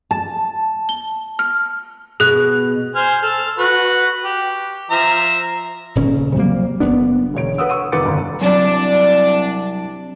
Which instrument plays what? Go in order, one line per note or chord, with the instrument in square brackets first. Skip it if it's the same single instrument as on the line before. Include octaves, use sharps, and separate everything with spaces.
[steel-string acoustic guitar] A5
[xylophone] G7
F6
[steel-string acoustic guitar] B2 [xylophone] G#4 F#6
[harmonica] C5 G#5 F6
A4 F6
F#4 B4
G4
F3 E5 A#5
[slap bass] D#1 C#3 C#4
C3 F#3 G3 A#3
F#1 F#2 B3 D4
[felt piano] E1 D3 C#5 D7
B4 F#5 D#6 E6
C#6 E6 D#7
F1 D#3 B4 D6 A6 C#7
G1 D2
[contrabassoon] C2 [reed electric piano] F#3 [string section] D4